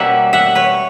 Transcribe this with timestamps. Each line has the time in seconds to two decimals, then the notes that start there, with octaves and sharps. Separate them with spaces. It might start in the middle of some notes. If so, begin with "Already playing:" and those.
Already playing: B2 G3 A#3 C#4 C#5 E5 F#5
0.33 E5 F#5
0.55 B4 C#5